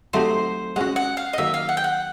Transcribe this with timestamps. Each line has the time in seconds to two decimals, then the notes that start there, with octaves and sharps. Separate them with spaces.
0.13 F#3 A3 C4 D#4 G4 C5
0.76 G#3 C#4 F#4 F#5
0.96 F#5
1.17 F5
1.33 D#5
1.38 D#3 F#3 A#3 E5
1.54 F5
1.69 F#5
1.77 G5
1.84 F#5